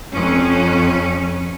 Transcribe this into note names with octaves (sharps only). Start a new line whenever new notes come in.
F2 C#4